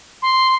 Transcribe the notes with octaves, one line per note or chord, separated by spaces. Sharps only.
C6